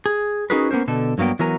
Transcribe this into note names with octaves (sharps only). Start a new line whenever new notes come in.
G#4
C#4 D#4 F#4 G#4 A#4 B4
A#3 B3 C#4 A#4 C5
B2 D3 A4
G2 F#3 A#3 B3 G5
E3 F#3 B3 A#4 G#5 A#5